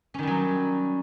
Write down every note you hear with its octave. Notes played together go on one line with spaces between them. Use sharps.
D#3 F#3 G3 C#4